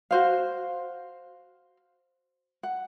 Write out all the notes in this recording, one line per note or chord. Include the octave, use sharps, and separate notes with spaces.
F#4 C5 F5
F#5